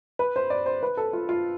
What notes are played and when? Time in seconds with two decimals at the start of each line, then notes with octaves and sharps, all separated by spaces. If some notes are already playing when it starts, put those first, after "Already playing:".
0.19 B4
0.36 C5
0.50 D5
0.66 C5
0.83 B4
0.97 A4
1.13 F4
1.29 F4